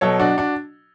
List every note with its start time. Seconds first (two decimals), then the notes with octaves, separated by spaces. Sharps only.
0.01 B2 F#3 A4 C#5
0.19 D4 F#4
0.38 D4 F#4